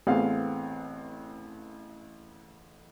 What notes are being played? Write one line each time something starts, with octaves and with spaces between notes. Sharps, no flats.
A1 A3 B3 C4 G#4 F5